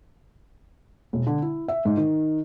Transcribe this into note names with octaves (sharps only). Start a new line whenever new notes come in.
E1
D3
E4
E5
G#2
D#3